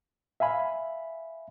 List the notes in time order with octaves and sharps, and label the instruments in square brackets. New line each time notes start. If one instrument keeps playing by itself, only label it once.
[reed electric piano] E5 F5 G#5 B5